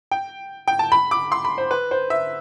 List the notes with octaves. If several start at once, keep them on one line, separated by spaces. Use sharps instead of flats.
G5
G5
A5
B5
D6
C6
B5
C5
B4
C5
E5